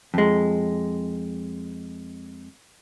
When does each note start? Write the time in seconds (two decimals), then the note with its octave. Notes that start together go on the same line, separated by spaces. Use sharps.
0.14 F2 G#3